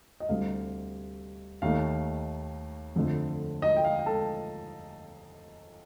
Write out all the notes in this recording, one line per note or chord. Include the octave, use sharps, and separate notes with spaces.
D#5
D2 C3 G3 F5
D#2 D#3 A3 F5
F2 D3 A3
D#5
G5
F5
G5
A4 A5